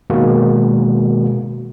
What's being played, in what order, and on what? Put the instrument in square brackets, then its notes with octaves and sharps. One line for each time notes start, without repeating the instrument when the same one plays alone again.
[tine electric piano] B2 D#3 G#3 A#3 F#4